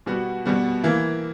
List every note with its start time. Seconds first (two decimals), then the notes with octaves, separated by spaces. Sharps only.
0.06 B2 G3 B3 F#4
0.45 B2 G3 B3 F#4
0.84 E3 A#3 E4